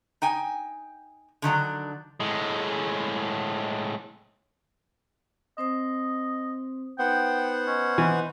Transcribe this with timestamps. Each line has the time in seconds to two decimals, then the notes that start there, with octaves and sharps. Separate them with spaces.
0.22 D#4 G5 G#5
1.42 D3 D#3 F#3 D4
2.20 A2 G#3
5.58 C4 C5 D#5 D#6
6.99 B3 D#4 C5 F#5 G5
7.67 C#4 D#5
7.98 E3 D#5 C6 C#6